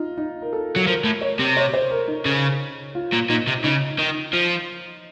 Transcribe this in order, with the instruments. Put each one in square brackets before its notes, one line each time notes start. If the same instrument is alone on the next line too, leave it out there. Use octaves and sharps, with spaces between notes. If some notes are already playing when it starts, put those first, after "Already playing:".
Already playing: [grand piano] D#4 F4
D#4
A#4
A4
[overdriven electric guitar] F#3
[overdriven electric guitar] F3 [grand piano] A#4
[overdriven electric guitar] A2
[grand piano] C#5
[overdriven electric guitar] C3
[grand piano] C#5
C5
A#4
D#4
[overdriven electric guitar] C#3
[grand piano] F4
[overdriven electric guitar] A#2
[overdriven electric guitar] A#2 [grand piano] D#4
[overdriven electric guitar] C3
[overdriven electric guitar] C#3 [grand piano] D#4
[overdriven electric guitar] D#3
F3